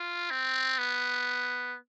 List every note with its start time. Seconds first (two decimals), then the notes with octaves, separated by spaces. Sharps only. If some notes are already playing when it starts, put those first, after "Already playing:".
Already playing: F4
0.30 C4
0.78 B3